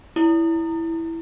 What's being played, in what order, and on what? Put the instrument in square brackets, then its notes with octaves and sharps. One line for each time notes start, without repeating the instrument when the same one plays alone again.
[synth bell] E4